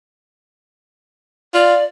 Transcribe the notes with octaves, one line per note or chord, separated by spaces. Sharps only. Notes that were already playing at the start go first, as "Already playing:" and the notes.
F4 D5